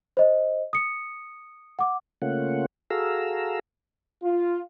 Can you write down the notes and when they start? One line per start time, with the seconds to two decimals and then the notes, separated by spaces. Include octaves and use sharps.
0.17 C5 D#5
0.73 D#6 C#7
1.79 F#5 D6
2.22 C#3 A3 A#3 C#4 F4 F#5
2.90 F#4 G#4 A4 F5 A#5 E6
4.22 F4